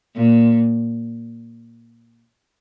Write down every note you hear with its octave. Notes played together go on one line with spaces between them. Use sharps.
A#2